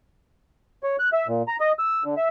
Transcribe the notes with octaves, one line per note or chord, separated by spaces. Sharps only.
C#5
F#6
E5
A#2
A#5
D#5
E6
D3
E5